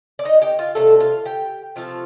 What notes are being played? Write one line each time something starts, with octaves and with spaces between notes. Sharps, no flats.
D5
D#4 D#5
G4 G5
F4 F5
C3 G3 A3 A4
F4 F5
G4 G5
C3 F3 A3 F4 F5